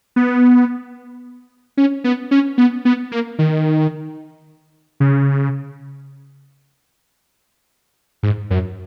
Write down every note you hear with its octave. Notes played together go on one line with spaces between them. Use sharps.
B3
C#4
B3
C#4
B3
B3
A#3
D#3
C#3
G#2
F#2